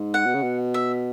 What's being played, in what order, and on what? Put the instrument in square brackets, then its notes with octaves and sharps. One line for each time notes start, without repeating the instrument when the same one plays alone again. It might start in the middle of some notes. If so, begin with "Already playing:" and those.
Already playing: [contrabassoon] G#2
[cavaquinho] F#5
[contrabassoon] B2
C#3
B2
[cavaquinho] E5